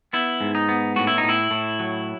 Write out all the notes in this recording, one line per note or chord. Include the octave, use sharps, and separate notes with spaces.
B3 E4
G#2
D#4
B3
A2 F#4
E4
D#4
A2
E4
A2
F#3